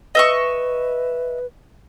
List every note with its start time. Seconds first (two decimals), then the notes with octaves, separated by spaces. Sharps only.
0.15 B4 D#5 E5 C#6